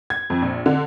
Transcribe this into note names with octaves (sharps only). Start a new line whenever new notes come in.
G#6
F2
A#1
D3